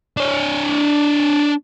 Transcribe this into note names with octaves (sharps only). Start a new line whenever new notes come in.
D4 C#5